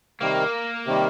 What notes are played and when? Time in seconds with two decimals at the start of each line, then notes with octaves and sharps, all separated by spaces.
0.21 C3 D#3 G3 A#3
0.86 C3 D#3 G3